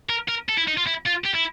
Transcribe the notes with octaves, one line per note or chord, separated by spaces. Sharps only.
A#4
A#4
A4
E4
D#4
F4
E4
F4
G4
E4